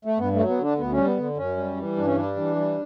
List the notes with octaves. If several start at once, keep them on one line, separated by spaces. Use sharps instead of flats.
A3
G2 B3
A3
F#3
B3
D3 D4
D2 B3
C#4
G3
B3
D3
F#2 C#4
G3
E3
G2 D4
C#4
G3 D4
E3
G3